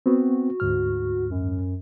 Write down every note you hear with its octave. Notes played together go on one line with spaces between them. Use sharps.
B3 C4 F#4
D2 G#2 F6
F#2